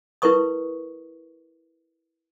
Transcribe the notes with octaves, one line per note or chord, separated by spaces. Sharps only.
E4 A#4 B4 C#6 D#6